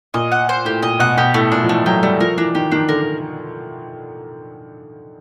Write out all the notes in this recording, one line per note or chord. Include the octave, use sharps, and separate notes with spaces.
A#2 D#5
F#5
C5
A2 G4
A#2 D#5
B2 F#5
B2 G4
A2 A3
A#2 D4
F3
E3 A3
F#3 G4
G3 A3
F3 A#4
E3 D4
D#3 G4
D#3 D4
D3 A#4